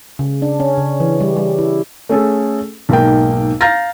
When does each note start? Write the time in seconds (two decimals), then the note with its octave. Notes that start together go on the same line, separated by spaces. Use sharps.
0.19 C#3
0.42 D4
0.60 C#4
0.77 C#3
1.00 E3
1.20 G3
1.37 G3
1.58 E4
2.09 A3 C#4 G#4 A4
2.89 B1 G#2 A#3 G5
3.61 F5 A#5 F6 G6 A6 A#6